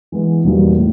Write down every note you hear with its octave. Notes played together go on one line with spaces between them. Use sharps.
E3 G#3 B3
E2 B2 G3 A#3 D#4
A2